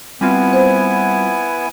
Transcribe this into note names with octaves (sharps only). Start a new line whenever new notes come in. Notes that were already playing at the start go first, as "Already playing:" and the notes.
G3 B3 C4 E4 F4 G#5
C5